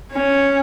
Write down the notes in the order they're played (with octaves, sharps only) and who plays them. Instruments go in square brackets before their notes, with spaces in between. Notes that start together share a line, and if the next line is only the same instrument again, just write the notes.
[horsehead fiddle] C#4